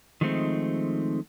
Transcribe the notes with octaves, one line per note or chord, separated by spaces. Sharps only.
D#3 F3 G#3 A3 C4 D#4